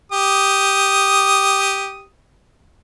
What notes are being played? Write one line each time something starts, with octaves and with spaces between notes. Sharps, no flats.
G4 D#6